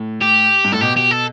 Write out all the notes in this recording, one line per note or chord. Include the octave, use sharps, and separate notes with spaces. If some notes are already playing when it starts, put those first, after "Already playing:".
Already playing: A2
G4
G2
A2 A4
B2 G4
G4
A4